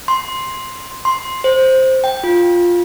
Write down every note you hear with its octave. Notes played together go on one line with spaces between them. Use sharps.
C6
C6
C5
G5
F4